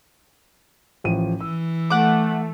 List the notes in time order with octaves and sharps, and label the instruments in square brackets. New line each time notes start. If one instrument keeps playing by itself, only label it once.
[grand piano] A1 F3 D#7
[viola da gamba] E3 [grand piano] E6
[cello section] A3 [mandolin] F#5 D6